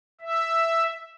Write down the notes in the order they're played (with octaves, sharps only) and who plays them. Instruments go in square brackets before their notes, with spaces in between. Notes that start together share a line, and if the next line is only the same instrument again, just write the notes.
[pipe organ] E5